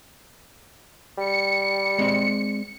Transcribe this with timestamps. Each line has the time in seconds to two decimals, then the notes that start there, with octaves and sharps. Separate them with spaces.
1.18 G3 C#7
1.99 G#3 C4 D5